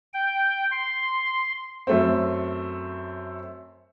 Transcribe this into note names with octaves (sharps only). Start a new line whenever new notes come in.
G5
C6
F#2 A3 C4